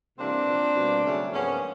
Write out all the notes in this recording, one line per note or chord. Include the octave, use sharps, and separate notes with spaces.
C3 E3 G3 A#3 C4 D4
A#2 F3 A#3
B2 G3 A#3
C#3 F#3 A3
G#2 F3 A#3 B3 C#4